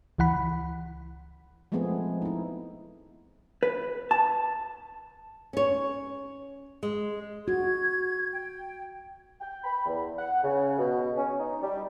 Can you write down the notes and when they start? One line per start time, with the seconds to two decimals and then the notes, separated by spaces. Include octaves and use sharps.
0.18 C#2 E3 F#5 B5
1.72 F3 G#3 A3 B3 C4 G#4
2.22 D#4 E4
3.63 B4
4.11 A5
5.53 C#4 C#5
6.83 G#3
7.48 F#4 G#6
8.33 G5
9.41 G5
9.64 B5
9.86 E2
10.18 F#5
10.43 C#3
10.79 B2
11.17 C#4
11.39 D#4
11.62 G3